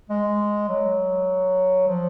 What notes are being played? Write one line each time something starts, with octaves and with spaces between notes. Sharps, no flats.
G#3
F#3
F3